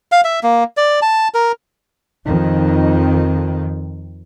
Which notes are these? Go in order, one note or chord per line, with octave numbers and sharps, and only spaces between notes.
F5
E5
A#3
D5
A5
A#4
F2 D#3